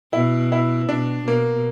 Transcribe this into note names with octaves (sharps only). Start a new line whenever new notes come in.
B2 E4
E4
B2 D4
B2 A#3